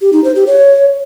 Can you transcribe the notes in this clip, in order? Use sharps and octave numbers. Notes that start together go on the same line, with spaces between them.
G4
D#4
C5
G4
C#5